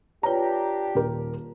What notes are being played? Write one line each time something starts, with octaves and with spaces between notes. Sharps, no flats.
D4 F4 G4 B4 C#5 A#5
D#1 A#4